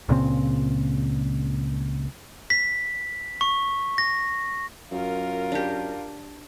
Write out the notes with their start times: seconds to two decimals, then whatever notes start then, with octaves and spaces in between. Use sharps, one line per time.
0.09 C#2 A#2 C#3 C4
2.50 B6
3.41 C#6
3.98 A#6
4.91 F#2 F4 A#4
5.52 D4 G4